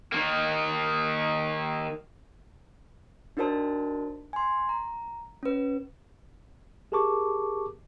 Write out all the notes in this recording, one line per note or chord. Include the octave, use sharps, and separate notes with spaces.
D#3 A#3
D4 D#4 F#4 A#4 C5 A5
G#5 C6
A#5
C#4 B4
G4 G#4 A#4 A5 C#6 D6